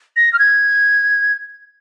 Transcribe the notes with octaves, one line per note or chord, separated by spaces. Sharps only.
A#6
F6
G#6